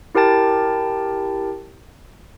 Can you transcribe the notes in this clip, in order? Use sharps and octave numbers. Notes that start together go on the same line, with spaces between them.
E4 G4 A#4 G5 A5 A6